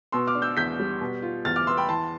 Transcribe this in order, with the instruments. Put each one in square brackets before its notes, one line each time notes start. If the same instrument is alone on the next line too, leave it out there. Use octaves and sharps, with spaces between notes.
[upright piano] B2 [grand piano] C6 E6
[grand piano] D6 F6
[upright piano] D4
[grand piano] E6 G6
[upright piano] E2 [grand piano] G6 B6
[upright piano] G3
B2
F4
[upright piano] E2 [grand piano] F6 A6
[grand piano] D6 F6
[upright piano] B3 [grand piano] C6 E6
[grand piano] G5 B5
[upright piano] E3 [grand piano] A5 C6